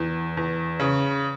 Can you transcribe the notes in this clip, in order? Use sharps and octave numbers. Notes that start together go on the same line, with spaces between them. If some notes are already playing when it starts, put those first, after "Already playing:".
Already playing: E2
E2
C#3